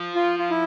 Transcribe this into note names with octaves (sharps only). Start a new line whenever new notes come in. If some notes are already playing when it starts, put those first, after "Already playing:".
Already playing: F3
F4
F4
E4